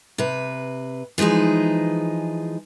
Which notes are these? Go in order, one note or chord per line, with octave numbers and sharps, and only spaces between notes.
C3 B4
E3 F3 G#3 D#4 G#4